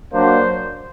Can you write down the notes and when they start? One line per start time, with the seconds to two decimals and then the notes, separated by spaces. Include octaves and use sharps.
0.13 F#3 A#3 D4 C5